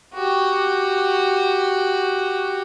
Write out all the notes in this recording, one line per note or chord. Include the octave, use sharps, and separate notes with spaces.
F#4 G4